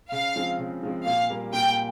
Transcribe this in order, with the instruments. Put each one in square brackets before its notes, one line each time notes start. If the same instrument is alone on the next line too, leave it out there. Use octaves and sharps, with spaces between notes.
[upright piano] C#3 [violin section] F5
[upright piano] F3 G#3 C4
C#3
F3 G#3 C4
[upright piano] A#2 [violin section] F5
[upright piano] G3 A#3
[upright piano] A#2 [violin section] G5